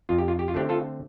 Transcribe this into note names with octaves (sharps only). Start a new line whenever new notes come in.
F2 F4
G4
F4
G4
F4
D3 A3 C4 D4 G4
F4 A4